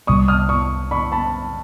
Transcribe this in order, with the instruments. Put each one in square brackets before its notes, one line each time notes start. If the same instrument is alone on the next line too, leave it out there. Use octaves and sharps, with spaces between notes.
[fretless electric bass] C2 C3 E3 G3 [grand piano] C#6 D#6
[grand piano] D#6 F6
C#6 D#6
B5 C#6
A5 B5